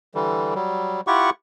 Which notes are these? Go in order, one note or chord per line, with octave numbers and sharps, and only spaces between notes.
D3 E3 G3
F#3 G3
E4 F4 G4 F#5 C#6